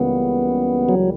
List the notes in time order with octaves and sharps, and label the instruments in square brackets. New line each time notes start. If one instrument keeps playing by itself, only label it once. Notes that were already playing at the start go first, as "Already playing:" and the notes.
Already playing: [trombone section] C#2 C#3 E3 G3 A#3 [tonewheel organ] B3
[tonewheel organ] F#3